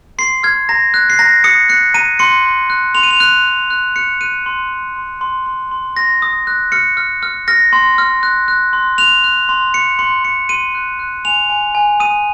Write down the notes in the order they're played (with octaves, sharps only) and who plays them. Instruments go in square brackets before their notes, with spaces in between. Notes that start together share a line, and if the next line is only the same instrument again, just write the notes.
[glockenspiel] C6 C7
F6 G#6
A#5 A#6
F#6
C7
A#5 A#6
D#6 C#7
F#6 C#7
A#5 D#7
C6 C#7
C6
F#6
C6 F7
D#7
F7
F#6
F#6
F#6
F#6 C#7
F#6 D#7
C6
C6
C6
C6
C6
C6
C6 A#6
D#6
F#6
F6 C#7
F6
F6
F6 A#6
C6
F6
F#6
F#6
C6
F#6 F7
F#6
C6
F#6 C#7
C6 C#7
C6 C#7
C6 D#7
F#6
F#6
G#5 F7
G#5
G#5
D#6 D#7